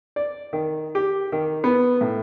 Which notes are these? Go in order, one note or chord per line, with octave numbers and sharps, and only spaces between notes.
D5
D#3
G4
D#3
B3
A2